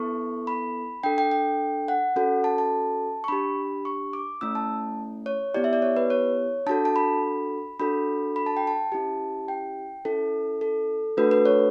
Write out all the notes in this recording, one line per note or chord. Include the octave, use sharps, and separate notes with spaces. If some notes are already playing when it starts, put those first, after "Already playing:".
Already playing: B3 E4 A4 C#6
B5
D4 A4 G5
G5
G5
F#5
C#4 F#4 A4
A5
A5
C#6
D4 G4 B5
C#6
D6
A3 C#4 E4 E6
A5
C#5
B3 E4 G4 D5
E5
D5
C#5
B4
C#5
D4 F#4 A4 A5
A5
B5
D4 F#4 A4 B5
B5
A5
G5
A5
C#4 E4 G4
G5
C#4 E4 A4
A4
A3 D4 F#4 A4 B4
B4
C#5